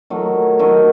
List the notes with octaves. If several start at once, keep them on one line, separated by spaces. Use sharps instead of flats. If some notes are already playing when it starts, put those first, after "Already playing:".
D#3 F#3 A3
D#3 F#3 A3